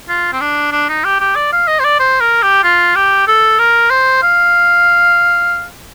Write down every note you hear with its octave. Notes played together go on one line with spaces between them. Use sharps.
F4
C4
D4
D4
D#4
G4
G4
D5
F5
D#5
C5
D5
C5
A#4
G4
F4
G4
A4
A#4
C5
F5